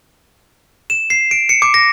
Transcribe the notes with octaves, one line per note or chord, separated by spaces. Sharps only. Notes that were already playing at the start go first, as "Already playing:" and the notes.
E7
C7
D7
C#7
D6
A#6